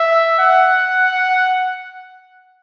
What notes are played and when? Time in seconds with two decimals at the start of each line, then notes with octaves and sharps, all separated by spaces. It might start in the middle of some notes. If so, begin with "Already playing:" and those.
Already playing: E5
0.39 F#5